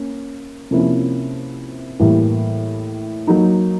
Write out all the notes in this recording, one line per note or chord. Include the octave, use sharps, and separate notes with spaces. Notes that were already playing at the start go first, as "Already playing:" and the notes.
Already playing: A#3 C#4
C3 F3 A#3 C#4 E4
A2 E3 G3 A#3
F#3 A#3 D#4